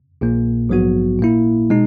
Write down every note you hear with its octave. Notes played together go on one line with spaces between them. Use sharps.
A#1 A#2 A#3
A#1 G#2 F#3 B3 F#4
A#2 A#3 E4
B2 G#3 D#4